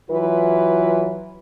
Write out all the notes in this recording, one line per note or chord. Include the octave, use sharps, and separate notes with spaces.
E3 F#3 F4 B4